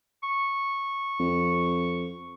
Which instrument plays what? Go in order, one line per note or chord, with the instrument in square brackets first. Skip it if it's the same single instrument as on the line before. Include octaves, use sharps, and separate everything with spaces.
[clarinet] C#6
[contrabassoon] F2